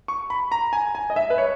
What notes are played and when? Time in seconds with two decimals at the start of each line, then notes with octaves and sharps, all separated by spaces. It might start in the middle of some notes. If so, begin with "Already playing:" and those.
0.08 C#6
0.30 B5
0.52 A#5
0.73 G#5
0.95 G#5
1.10 D#5
1.16 E5
1.30 B4
1.38 C#5